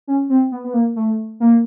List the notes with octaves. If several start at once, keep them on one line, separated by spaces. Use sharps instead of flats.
C#4
C4
B3
B3
A#3
A3
A#3